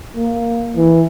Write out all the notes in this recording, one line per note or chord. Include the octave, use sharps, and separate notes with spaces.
A#3
E3